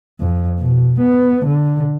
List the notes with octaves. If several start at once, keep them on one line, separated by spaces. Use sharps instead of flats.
F2
B2
B3
D3